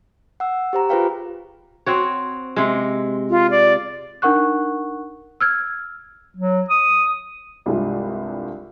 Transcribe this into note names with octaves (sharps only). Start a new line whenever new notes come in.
F#5 E6
G4 C5 A#5
F4 G#4 B4 C5 F5 G5
C4 F#4 C#5
C3 G#3
F4
D5
D4 D#4 A#4 F#5 C#6 F#6
E6 F6 G#6
F#3
D#6
C2 G2 G#3 E4 F4